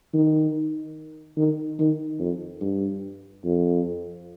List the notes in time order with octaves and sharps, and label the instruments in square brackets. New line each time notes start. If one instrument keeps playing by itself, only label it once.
[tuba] D#3
D#3
D#3
F2
G2
F2